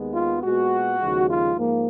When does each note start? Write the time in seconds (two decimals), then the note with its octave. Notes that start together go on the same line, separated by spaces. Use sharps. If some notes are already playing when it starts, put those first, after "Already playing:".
Already playing: D#2 D#3 G#3 B3
0.14 F4
0.43 A#2 G#3 B3 F#4
0.99 D#2 C#3 F3 G#3
1.28 F4
1.56 G#2 F3 A#3